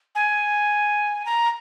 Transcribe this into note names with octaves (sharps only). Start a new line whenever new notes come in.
G#5
A#5